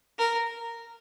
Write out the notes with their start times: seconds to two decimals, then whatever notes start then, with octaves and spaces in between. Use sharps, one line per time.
0.19 A#4